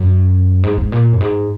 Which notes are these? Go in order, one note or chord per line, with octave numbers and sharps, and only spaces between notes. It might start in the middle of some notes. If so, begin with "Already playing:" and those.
Already playing: F#2
G#2
G#2
A#2
F#2
G#2